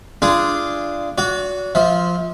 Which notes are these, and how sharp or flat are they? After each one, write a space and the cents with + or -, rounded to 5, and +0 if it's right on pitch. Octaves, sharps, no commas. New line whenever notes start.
D4 +0 F4 -25 G#4 +0
F#4 -15 D5 -40
F3 +0 E5 -35